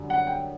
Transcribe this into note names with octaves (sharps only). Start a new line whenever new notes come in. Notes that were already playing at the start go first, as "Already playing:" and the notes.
Already playing: F#2 D3 G3
F#5
G5